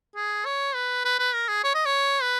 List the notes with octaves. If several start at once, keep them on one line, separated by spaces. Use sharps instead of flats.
G#4
C#5
B4
B4
B4
A#4
G#4
C#5
D#5
C#5
B4